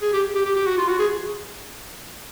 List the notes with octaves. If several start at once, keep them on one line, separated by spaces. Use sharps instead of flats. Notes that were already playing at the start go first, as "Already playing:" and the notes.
G#4
G4
G4
G4
G4
F#4
F4
F#4
G#4